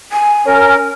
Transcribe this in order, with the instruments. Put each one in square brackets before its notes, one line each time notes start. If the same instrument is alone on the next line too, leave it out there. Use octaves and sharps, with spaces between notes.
[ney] G#5
[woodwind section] C#4 A#4